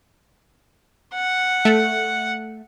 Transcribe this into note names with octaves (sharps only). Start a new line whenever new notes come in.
F#5
A3